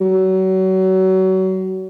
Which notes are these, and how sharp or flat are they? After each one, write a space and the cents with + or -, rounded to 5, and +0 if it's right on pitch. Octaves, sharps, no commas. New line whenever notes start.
F#3 +30